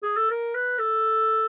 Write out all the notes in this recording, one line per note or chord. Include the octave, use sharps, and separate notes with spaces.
G#4
A4
A#4
B4
A4